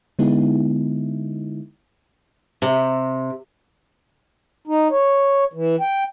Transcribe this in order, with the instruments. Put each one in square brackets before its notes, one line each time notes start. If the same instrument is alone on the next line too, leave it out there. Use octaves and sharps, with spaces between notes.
[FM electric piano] D3 G#3 B3 D#4 E4
[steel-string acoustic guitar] C3
[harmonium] D#4
C#5
E3
G5